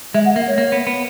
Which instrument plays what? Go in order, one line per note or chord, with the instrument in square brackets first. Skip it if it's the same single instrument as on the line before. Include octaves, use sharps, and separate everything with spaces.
[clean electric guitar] G#3 [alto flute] E5
[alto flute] F#5
[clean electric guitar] A#3 [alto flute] E5
[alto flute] C#5
[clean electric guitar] A#3
B3
B3